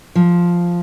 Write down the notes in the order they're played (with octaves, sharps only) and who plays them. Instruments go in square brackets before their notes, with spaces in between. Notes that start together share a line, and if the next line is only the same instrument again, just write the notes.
[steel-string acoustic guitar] F3